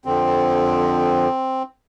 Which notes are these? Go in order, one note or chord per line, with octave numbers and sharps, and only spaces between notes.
F2 D3 F3 C4